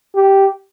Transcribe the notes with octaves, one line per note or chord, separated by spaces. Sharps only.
G4